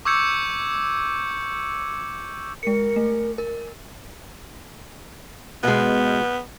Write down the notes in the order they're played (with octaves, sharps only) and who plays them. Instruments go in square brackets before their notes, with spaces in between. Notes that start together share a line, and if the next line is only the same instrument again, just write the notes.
[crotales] C#6 D6 E6 G6 G#6 C#7
[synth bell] G#3 C#7 [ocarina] A#4
[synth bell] A3
A#4
[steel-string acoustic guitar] B2 G#3 [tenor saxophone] B3